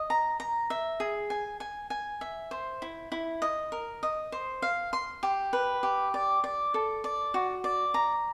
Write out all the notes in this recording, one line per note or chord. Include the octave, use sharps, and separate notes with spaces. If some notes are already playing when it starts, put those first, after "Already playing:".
Already playing: D#5
A#5
A#5
E5
G#4
G#5
G#5
G#5
E5
C5
E4
E4
D#5
A#4
D#5
C5
F5
C6
G4
B4
G4
D5
D5
A4
D5
F#4
D5
A#5